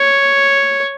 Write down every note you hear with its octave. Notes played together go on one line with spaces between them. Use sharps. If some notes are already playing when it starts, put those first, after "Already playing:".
Already playing: C#5